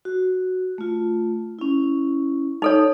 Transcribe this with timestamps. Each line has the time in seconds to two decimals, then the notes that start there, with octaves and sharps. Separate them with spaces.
0.05 F#4
0.78 A3 F4
1.59 C#4 E4
2.62 D#4 A4 C#5